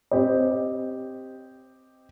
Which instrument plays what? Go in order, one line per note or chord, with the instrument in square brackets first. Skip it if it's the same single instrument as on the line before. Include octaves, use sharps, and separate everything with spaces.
[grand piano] C4 G4 D#5